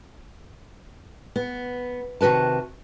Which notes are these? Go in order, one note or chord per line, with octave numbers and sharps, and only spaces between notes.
B3
C3 D#3 F#4 B4 A5